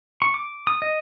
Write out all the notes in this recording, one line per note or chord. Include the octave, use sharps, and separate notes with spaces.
C#6
D6
D#6
D#5